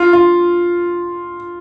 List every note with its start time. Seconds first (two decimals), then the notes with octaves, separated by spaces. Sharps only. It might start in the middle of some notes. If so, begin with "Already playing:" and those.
Already playing: F4
0.13 F4